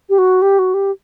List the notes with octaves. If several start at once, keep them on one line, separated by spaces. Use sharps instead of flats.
G4
F#4
G4
F#4
G4